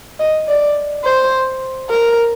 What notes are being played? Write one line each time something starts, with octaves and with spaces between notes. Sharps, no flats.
D#5
D5
C5
A#4